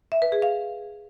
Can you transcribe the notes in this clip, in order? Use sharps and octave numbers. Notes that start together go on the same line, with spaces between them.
E5
B4
G#4
F5